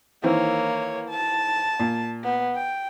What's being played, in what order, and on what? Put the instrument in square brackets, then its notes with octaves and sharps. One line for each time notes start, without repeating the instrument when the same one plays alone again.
[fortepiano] D#3 E3 C4 [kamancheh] A#3 C#5
[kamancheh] A5
[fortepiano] A#2
[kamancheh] B3
G5